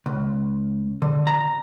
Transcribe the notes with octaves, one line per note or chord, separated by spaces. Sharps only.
C#2
D3
A#5